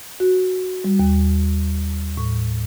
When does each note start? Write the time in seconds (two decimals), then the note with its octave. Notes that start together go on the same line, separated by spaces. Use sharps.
0.20 F#4
0.84 G3
1.00 D#2
2.17 A2